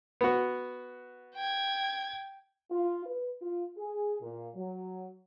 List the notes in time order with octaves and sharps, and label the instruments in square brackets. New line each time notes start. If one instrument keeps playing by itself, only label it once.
[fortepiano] B3 F#4
[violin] G5 G#6
[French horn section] F4
B4
F4
G#4
A#2
F#3